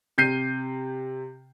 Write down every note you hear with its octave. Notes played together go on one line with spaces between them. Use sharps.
C3 G6 C7 D#7